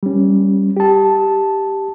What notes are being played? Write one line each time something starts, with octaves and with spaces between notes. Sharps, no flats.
G3 C#4
G4 A5